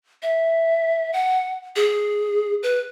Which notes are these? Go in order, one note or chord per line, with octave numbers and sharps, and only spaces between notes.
E5
F#5
G#4
B4